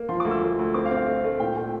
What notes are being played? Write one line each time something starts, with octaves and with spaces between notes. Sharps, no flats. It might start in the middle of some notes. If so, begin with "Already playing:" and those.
Already playing: A#3
F3 C6
D2 D6
E6
D2
D2
C4 D6
F5
C4
F5
A3
A3
A#2 G5
A3 G5